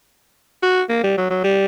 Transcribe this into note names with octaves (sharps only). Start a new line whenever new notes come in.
F#4
A#3
G3
F#3
F#3
G3